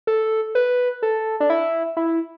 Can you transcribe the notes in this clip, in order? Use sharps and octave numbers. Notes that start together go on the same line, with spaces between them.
A4
B4
A4
D4
E4
E4